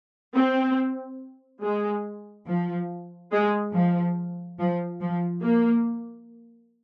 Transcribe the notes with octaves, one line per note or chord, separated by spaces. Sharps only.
C4
G#3
F3
G#3
F3
F3
F3
A#3